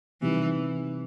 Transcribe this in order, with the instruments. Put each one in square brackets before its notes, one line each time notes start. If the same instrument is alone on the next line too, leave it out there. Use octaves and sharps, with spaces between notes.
[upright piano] C3 D#3 G3 [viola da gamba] E3